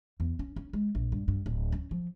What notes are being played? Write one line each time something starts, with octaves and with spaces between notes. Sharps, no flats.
E2
C#4
C#4
G#3
A#1
G2
G2
D1
C#4
F3